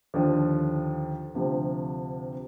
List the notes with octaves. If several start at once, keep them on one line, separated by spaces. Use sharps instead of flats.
D#2 D3 F3
D2 C3 F3